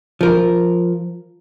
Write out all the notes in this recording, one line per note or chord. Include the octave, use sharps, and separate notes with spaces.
F3 A#4